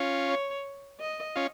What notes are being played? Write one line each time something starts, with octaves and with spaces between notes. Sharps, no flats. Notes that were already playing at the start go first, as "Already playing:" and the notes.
Already playing: C#4 F4
C#5
D#5
C#4 F4